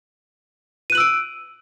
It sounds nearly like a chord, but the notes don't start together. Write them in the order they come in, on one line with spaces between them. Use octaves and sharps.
D#7 F#6 F#7 E6 D7